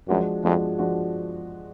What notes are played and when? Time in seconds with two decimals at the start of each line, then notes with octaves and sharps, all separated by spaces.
0.08 F#2 F3 G#3 D4 F#4
0.43 F2 F3 G#3 D4 F#4
0.78 F3 G#3 D4 F#4